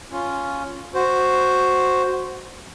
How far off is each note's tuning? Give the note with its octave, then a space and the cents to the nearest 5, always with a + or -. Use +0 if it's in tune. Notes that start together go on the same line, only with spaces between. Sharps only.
C#4 +5 F4 +0
F#4 +0 C5 +0